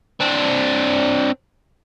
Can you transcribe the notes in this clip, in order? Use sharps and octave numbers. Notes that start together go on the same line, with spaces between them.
C4 D4